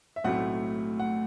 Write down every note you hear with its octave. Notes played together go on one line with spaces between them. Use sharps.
E5
B1 A2 F#3 A3 C4 F#5
F#5